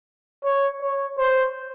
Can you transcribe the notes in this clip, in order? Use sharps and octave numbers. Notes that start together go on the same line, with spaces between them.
C#5
C#5
C5